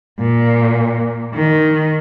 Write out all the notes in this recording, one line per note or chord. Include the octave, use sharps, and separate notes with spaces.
A#2
D#3